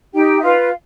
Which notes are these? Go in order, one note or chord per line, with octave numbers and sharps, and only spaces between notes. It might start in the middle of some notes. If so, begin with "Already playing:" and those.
D#4 G4 G5
E5
F4 B4 F5